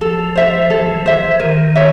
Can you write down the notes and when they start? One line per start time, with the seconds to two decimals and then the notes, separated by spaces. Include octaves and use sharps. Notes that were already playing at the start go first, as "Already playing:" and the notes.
0.01 F3 A4
0.36 C5 E5
0.70 E3 A4
0.79 F3
0.87 E3
0.97 F3
1.05 E3 C5 E5
1.40 D#3 A#4
1.75 C#5 E5